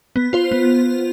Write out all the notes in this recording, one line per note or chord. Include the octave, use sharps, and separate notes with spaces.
B3
F4 C5
B3